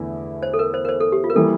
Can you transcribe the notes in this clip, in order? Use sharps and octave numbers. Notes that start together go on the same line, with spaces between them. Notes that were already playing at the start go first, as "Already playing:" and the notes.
Already playing: E2 D3 A3 E4
C5
A4
A#4
C5
A#4
C5
A4
G4
F4
A#4
E3 G3 A#3 A4